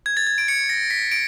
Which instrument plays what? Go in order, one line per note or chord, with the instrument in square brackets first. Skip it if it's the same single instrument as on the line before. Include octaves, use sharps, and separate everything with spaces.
[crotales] G#6
A6
G#6
D7
C#7
A#6
B6
D7